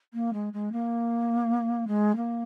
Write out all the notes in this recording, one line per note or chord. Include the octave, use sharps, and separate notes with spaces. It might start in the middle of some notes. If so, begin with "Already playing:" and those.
A#3
G#3
G#3
A#3
G#3
A#3